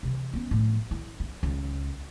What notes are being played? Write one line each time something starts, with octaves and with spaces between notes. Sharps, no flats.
C3 E3
B3 C#4
A2 F3
E4
C#4
C#2